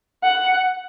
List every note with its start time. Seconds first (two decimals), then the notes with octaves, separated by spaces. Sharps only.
0.23 F#5